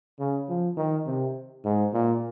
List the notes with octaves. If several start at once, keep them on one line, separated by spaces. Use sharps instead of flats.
C#3
F3
D#3
C3
G#2
A#2